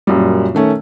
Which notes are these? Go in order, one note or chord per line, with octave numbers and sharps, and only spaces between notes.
F#2 A#2 G3
D#3 A3 C#4